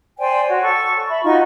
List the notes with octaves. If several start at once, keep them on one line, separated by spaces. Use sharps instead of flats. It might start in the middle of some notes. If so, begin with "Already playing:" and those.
C5 D5 G5 G#5
F#4 C#5
A4 C#6
E5 B5
D#4 F4 F#4 C#6